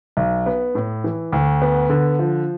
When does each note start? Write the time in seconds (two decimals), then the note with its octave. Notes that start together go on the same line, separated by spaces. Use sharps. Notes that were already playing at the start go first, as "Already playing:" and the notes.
0.17 B1
0.46 B3
0.75 A2
1.04 E3
1.32 D2
1.62 B3
1.89 D3
2.19 F3